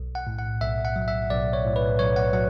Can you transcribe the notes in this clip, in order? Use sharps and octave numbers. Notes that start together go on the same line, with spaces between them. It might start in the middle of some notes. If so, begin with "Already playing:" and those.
Already playing: B1
F#5
A2
F#5
B1 E5
F#5
F#3
E5
B1 D5
C#5
A2
B4
B1 C#5
F#5
F#3 F#5